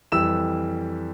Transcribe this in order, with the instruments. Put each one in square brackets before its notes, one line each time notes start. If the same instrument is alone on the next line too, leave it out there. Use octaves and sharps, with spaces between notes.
[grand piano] F2 E3 G3 E6 E7